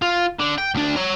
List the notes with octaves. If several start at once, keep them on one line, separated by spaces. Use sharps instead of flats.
F4
D3
G5
D2 D4
C#5 A#5